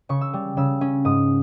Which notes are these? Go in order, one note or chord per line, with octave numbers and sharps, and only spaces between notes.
C#3 C#6
E6
G3
C#3 E6
C#4
G#2 D#6